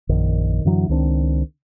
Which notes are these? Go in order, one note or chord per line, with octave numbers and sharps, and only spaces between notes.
A#1 F#2 D#3
F#2 D3 E3 F#3
C#2 D#3 C4 D4